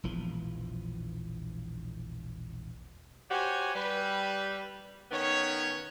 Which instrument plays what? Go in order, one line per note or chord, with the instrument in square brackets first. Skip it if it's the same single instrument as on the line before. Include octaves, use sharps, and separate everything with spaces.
[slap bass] E1 A#1 E3 F3
[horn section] F#4 G4 C5 C#5 G#5
G3 B4
D#3 B3 C#4 C#5